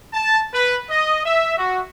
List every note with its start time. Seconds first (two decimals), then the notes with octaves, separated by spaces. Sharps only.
0.13 A5
0.53 B4
0.89 D#5
1.25 E5
1.58 F#4